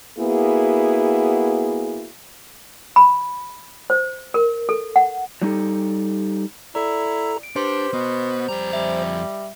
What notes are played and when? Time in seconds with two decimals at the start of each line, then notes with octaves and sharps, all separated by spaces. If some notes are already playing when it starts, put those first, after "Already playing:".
0.19 A#3 B3 E4 F#4 G#4
2.96 B5
3.90 C5
4.34 A#4
4.69 A4
4.96 F#5
5.42 F#3 G3 D#4 G4 A4
6.75 E4 A4 D5 A#5
7.43 D7
7.56 D4 G4 B4 C5 C6
7.93 B2 B3
8.48 F2 G3 A#5
8.73 G3 E5